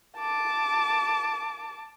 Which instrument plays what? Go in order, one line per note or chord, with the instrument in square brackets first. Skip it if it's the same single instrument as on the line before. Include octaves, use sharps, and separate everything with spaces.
[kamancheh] A5 D6